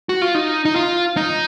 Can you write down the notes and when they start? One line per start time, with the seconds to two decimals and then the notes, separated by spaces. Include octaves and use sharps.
0.09 F#4
0.22 F4
0.35 D#4
0.65 D#4
0.76 F4
1.17 D#4